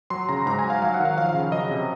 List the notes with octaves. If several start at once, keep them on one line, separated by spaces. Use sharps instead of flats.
F#3 C6
C#3 A#5
G#2 A#5
F#3 G#5
F5
F#3 F5
F#5
D#3
F5
F3 F5
F5
C#3
F5
F#3 D#5
C3